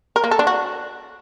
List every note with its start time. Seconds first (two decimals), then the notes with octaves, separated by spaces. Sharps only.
0.16 A#4
0.24 A#3
0.31 A4
0.39 D4
0.47 F#4